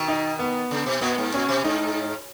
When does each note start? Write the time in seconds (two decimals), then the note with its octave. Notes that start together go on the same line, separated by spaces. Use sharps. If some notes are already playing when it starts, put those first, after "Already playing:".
Already playing: B2 D#3
0.08 D#4
0.39 B3
0.71 C#3
0.86 B2
1.01 A#2 B3
1.18 G#2
1.34 A#2 C#4
1.48 B2
1.64 G#2 D#4